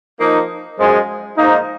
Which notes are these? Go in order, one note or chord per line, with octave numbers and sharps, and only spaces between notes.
F3 A#3 D#4
F#2 F3 G#3
G#2 F3 A#3 D#4